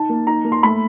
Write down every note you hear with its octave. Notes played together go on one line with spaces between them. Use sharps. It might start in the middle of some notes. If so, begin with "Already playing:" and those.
Already playing: D#4 A5
A#3
D#4 A#5
A#3
C6
A3 B5